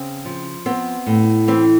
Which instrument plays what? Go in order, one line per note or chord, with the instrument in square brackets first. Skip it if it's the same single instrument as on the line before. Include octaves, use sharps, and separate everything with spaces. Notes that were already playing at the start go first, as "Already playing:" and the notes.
Already playing: [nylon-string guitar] C#3 C4
F3
B3 C4
A2
E3 C4